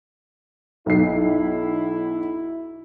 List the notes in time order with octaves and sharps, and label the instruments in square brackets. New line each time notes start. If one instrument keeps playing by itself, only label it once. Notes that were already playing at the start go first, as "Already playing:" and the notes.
[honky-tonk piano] B1 C7 [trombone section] E4